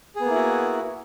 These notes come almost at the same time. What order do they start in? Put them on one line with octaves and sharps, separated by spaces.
G#4 B3 A#3 E4 F#4